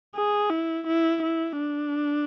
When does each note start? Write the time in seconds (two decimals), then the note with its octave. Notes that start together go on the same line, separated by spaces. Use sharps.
0.15 G#4
0.50 E4
0.87 E4
1.22 E4
1.58 D4